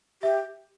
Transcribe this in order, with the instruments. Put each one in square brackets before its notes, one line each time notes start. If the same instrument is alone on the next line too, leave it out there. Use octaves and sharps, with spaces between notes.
[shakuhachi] G4 [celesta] E5